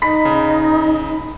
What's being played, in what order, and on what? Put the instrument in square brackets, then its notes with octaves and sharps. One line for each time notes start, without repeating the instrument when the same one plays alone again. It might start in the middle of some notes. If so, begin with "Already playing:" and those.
[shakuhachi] D#4 [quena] D#5 [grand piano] B5 B6
[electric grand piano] C#3